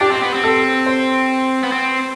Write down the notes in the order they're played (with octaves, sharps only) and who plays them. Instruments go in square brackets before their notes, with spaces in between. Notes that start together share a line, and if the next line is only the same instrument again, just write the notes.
[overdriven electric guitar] D4 [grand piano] G4
[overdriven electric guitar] C4
B3
C4
[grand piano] A4
C5
[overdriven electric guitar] B3
C4